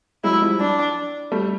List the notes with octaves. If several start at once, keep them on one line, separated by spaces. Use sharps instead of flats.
F#3 G#3 E4
F3 G3
D4
G3 A3